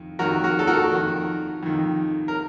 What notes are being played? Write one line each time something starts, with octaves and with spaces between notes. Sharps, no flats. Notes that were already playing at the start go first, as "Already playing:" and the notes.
Already playing: F2 D#3
F2 D#3 F#4 A#4
F#4 A#4
A4
F#4 A#4
F2 D#3
F2 D#3
A#4